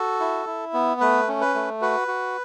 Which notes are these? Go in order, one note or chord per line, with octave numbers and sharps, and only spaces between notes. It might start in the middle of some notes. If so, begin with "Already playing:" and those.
Already playing: F#4 A4
E4
E4
B3
A3 B4
C#4
B4
A3
F#4 B4
F#4